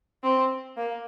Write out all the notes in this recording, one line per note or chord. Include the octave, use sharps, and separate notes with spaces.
C4
A#3